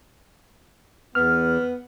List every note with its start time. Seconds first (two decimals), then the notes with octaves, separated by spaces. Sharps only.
1.15 E2 B3 F6